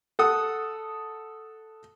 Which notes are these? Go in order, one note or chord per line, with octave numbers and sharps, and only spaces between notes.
A4 F#5 D#6